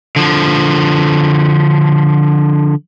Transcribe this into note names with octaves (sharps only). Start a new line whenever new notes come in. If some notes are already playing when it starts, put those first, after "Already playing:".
D3 F3